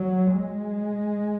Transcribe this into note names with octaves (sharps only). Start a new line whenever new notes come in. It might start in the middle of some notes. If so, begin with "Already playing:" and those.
Already playing: F#3
G#3